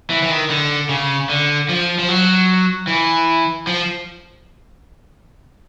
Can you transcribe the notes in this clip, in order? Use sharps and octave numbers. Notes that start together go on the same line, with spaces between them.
E3
E3
D#3
D3
C#3
D3
F3
F3
F#3
E3
F3